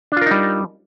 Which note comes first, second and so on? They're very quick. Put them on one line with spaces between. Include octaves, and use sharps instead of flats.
D4 F4 A#4 D#4 G3